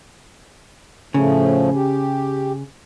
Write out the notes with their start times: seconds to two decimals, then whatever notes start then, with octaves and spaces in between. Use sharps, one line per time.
1.14 A2 C#3 F3 A3
1.74 G4